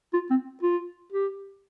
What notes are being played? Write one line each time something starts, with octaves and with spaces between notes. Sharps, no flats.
F4
C4
F4
G4